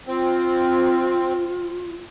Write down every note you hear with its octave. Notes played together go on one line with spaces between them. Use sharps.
C4 F4